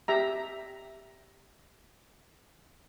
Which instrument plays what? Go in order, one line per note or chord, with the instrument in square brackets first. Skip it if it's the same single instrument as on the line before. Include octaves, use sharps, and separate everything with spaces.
[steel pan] G4 E5 A#5